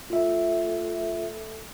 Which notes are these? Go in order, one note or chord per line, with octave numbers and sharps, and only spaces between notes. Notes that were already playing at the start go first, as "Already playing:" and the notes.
A3 F4 E5